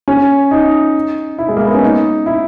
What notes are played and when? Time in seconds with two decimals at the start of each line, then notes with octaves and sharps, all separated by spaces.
0.08 C#4
0.51 D#4
1.39 E4
1.49 G#3
1.57 A#3
1.65 B3
1.74 C#4
1.82 D#4
2.26 E4